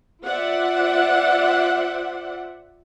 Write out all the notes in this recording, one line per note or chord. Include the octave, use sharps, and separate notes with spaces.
F4 C5 D5 E5 F#5